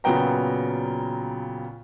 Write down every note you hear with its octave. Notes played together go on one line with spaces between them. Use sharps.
A#2 C#3 F#3 B3 G5 A#5